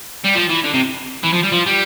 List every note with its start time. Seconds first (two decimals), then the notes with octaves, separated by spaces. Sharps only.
0.25 G3
0.35 F3
0.50 E3
0.64 D3
0.74 C3
1.23 E3
1.33 F3
1.43 G3
1.52 F3
1.66 G3